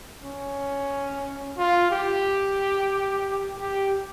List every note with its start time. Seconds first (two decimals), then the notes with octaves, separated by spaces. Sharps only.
0.23 C#4
1.58 F4
1.91 G4
3.59 G4